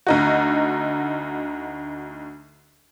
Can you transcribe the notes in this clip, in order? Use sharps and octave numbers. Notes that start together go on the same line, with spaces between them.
D2 D#4 F#4